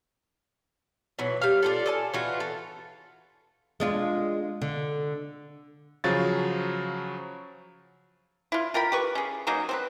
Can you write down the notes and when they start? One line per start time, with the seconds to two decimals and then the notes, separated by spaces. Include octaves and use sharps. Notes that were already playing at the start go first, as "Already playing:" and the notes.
1.19 B2 E3 F#3
1.42 G3 F5
1.63 D4 F4 A4
1.86 A4 G#5 A5
2.14 E3 F4 F#4
2.40 A4
3.80 G#3 D4 F4
4.62 D3
6.04 C#3 F3 F#3 C#5 F5 A6
8.52 E4 F4
8.74 F4 A#4 G5 B5
8.92 G4 B4 C#6
9.15 C#4 G#4
9.47 F#3 A#3 D#4 G#4
9.69 C4 G#4 B4